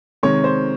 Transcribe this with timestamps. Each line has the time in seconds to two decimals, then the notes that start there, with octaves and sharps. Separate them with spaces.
0.23 C3 D#3 G#3 C#5
0.44 C5